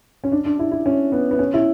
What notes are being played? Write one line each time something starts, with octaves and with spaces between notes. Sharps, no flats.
C#4
D4
D4
E4
E4
C#4
B3
B3
C#4
E4